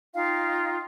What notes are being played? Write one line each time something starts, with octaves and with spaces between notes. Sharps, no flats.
D#4 F4 F5 G5